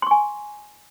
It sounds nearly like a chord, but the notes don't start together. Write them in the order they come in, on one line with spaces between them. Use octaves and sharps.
C6 C#6 G#5